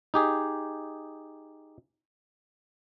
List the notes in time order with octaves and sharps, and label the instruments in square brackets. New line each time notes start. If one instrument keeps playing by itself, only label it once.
[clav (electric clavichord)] D#4 G4 G#4